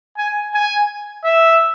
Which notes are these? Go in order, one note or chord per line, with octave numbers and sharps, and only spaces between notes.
G#5
G#5
E5